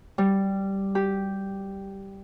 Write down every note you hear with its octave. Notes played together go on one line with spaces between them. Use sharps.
G3
G4